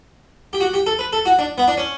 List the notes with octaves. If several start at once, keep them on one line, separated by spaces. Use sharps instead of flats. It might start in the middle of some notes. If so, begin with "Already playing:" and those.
G4
F#4
G4
A4
B4
A4
F#4
D4
B3
D4
C#4